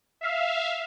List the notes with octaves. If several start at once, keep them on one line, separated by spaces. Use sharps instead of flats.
E5 F5